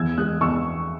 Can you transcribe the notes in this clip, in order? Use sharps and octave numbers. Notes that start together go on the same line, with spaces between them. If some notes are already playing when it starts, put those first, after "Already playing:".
Already playing: E2 E6 G#6
G#3 D#6 F#6
E2 C#6 E6